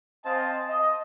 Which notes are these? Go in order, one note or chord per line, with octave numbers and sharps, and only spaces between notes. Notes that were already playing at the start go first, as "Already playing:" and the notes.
C4 C5 D#5 F5 G#5 A5
D#5